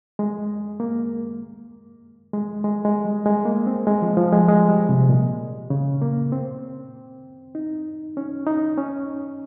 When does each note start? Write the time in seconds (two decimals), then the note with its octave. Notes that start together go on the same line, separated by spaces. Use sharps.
0.19 G#3
0.80 A#3
2.34 G#3
2.64 G#3
2.85 G#3
3.05 G3
3.26 G#3
3.45 A#3
3.67 C4
3.87 G#3
4.02 F3
4.17 F3
4.33 G#3
4.48 G#3
4.68 G3
4.89 C3
5.09 A#2
5.70 C#3
6.02 A#3
6.32 C4
7.55 D#4
8.17 C#4
8.47 D#4
8.78 C#4